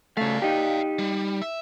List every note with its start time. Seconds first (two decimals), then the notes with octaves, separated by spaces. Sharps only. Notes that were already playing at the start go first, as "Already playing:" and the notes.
0.17 C#3 A3 D5 F5
0.42 D#4 G4
0.99 G3
1.42 E5